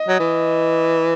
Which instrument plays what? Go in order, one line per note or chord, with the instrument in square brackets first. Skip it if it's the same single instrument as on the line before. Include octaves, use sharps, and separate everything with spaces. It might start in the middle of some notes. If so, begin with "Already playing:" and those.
Already playing: [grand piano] D#5
[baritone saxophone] F#3
E3